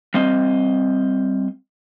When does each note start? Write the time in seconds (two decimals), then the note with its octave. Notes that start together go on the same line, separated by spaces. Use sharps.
0.14 G3 C4 D#5